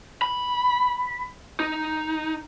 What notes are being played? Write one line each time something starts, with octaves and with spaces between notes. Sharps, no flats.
B5
D#4